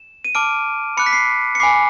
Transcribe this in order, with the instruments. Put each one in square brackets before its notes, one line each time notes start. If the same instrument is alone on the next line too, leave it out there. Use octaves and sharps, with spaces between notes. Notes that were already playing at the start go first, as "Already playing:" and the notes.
Already playing: [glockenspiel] E7
D#7
A5 D6 F6 D7
B5 D6 F#6 C#7
B6
C7
C#7
G#5 B5 D6 C7